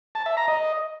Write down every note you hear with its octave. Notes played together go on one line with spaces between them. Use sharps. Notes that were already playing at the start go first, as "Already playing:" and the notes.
A5
E5
A#5
D#5